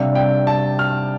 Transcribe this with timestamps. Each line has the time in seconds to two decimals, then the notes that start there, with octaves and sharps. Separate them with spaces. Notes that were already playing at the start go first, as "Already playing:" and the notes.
Already playing: C3 G3 D4 F5
0.15 G5
0.47 A5
0.79 F6